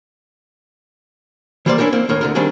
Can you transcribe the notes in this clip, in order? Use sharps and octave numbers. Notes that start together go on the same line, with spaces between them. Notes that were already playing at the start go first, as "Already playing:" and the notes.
E3 G3 A#3 C5 D5
C#4 D4 E4 G4 A#4
A#3 C4
D#2 A2 A#4
D2 D3 A#4
D#3 G3 C4 D4 G#4